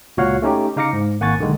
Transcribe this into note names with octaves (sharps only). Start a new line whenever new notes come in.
C#2 A#2 F#4 C#5 F5 F#5
A3 C#4 D#4 G4
C#3 D#4 F5 D6 A#6 C#7
G#2
G#1 A#3 F#5 G#5 C#6 A6
B1 D3 D#3 G#3